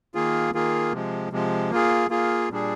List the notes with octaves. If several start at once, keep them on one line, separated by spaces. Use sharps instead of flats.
D#3 A#3 F4 G#4
D#3 A#3 F4 G#4
C3 F3 G#3
C3 F3 G#3
A#3 F4 G#4
A#3 F4 G#4
A#2 G3 D4 G#4